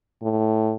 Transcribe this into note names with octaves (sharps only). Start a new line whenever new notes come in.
A2